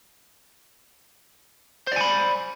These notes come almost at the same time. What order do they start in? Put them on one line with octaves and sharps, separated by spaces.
C5 D5 G#5 B5